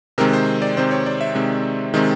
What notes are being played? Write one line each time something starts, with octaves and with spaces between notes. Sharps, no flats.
C3 D#3 G#3 C4 A#4
C5
D5
C3 D#3 G#3 C4 C5
C#5
D5
E5
C3 D#3 G#3 C4
C3 D#3 G#3 C4